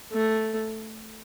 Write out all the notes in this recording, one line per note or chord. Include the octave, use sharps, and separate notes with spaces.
A3